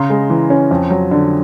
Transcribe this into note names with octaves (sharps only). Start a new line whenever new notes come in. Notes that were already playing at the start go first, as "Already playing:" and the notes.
Already playing: C#3 A#5 C6
G#3
E3
C#4
F2
F#3
D3